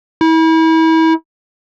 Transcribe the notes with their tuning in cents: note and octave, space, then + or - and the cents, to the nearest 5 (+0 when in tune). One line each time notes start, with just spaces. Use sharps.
E4 -35